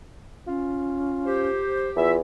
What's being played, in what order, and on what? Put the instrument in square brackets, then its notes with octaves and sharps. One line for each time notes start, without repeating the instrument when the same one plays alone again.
[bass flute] C#4 [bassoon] F4
[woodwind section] G4 C5
[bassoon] E2 [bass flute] F4 [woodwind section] E5